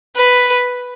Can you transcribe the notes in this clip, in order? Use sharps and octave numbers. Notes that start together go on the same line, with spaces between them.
B4